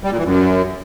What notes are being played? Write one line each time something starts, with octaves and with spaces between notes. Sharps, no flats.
G3
A#2
E3
F#2